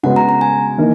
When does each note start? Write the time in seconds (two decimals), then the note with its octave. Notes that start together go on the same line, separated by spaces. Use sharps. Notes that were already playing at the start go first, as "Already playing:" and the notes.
0.03 C#3 G#3 B3 F#4 B4 F#5
0.16 A#5
0.29 A#5
0.41 G#5
0.78 E3 A#3 D#4 A#4